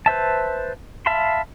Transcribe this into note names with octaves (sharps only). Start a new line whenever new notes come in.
B4 C5 E5 A5
E5 F5 A5 B5 C6